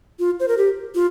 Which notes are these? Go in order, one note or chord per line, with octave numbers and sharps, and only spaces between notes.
F4
C5
A#4
G4
F4